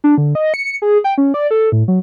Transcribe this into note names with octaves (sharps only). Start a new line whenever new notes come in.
D4
D3
D#5
C#7
G#4
G5
C#4
D5
A4
A2
F#3